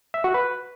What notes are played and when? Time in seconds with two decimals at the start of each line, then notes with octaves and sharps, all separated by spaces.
0.14 E5
0.24 F#4
0.34 B4